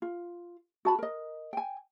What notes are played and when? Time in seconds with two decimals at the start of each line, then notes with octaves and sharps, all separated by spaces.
0.02 F4
0.85 F#4 A5 B5
0.99 A#4 D#5
1.53 G5 G#5